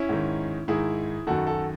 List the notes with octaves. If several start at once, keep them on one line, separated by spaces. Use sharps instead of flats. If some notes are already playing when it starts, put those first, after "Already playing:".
Already playing: C#4 E4
G#2 D#3
G#2 D#3 E4 G#4
F#2 D#3 F#4 A4
F#4 A4